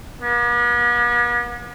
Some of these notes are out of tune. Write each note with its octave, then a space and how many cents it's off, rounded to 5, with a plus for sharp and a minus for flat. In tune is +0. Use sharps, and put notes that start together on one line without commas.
B3 -45